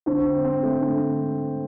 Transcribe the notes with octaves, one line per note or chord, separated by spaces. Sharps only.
D3 C5
C4
C4
A3
D3